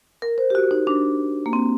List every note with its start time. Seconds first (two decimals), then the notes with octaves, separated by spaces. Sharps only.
0.22 A#4
0.38 C5
0.50 G4
0.55 F#4
0.71 D#4
0.87 D4
1.46 A#3
1.53 C4